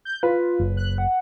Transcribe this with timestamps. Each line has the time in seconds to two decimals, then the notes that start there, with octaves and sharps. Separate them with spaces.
0.05 G6
0.23 F4 B4
0.60 F#1
0.77 F#6
0.98 F#5